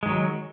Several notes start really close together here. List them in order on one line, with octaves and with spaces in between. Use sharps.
G#3 D#3 F#3